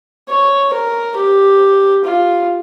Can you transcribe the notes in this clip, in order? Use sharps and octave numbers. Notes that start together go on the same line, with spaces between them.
C#5
A#4
G4
F4